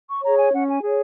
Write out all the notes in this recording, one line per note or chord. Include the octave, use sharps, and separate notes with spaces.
C#6
G#4 C#5 A#5
G#5
C#4 F#5
G#5
G#4
C#5